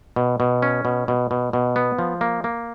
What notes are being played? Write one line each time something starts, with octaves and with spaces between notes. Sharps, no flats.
B2
B2
C#4
B2
B2
B2
B2
B3
F3
A#3
A#3